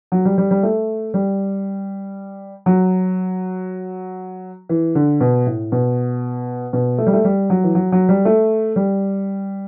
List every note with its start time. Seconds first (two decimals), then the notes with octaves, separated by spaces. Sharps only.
0.12 F#3
0.25 G3
0.38 G3
0.51 G3
0.63 A3
1.14 G3
2.66 F#3
4.69 E3
4.95 D3
5.21 B2
5.46 A2
5.72 B2
6.73 B2
6.98 A3
7.07 G3
7.13 A3
7.24 G3
7.50 F#3
7.64 E3
7.75 F#3
7.92 F#3
8.09 G3
8.25 A3
8.76 G3